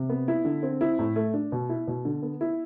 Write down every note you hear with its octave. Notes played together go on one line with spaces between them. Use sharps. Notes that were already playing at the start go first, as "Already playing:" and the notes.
Already playing: C3
B3
E4
D3
C4
E4
A2
A3
D4
B2
E4
B2
D3
B3
E4